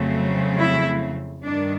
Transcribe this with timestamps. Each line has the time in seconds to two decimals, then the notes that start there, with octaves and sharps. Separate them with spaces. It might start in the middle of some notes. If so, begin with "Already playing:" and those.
Already playing: F2 C#3 F#3 A3 C4
0.58 E4
1.44 G2 D#3 D4